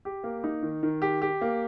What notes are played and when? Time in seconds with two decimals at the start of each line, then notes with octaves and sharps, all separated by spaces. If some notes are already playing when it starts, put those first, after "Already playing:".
0.05 G4
0.24 A#3
0.44 D#4
0.63 D#3
0.83 D#3
1.02 G4
1.22 G4
1.41 A#3